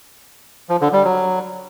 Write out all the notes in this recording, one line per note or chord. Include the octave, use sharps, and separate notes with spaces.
F3
D3
G3
F#3